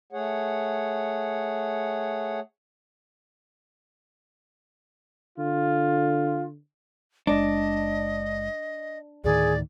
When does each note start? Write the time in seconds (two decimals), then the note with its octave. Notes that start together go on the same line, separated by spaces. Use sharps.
0.13 A3 G#4 C#5 F#5
5.38 D3 F4
7.27 F#1 G#3 D4 D#5
9.24 D2 A2 D#3 G#4 D5